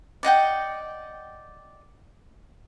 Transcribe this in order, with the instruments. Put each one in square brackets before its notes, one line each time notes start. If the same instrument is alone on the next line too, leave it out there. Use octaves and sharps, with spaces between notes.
[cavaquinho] D5 D#5 F#5 G5